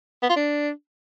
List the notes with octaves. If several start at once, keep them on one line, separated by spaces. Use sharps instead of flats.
B3
F4
D4